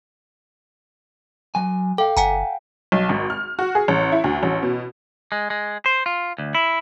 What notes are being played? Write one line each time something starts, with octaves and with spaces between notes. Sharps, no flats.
F#3 G#5
A4 F5 G5
F#1 F#5 G#5 A#5
B1
G#1
F6
F#4
G#4
A1
E4
D2
A1
B2
G#3
G#3
C5
F4
D2
E4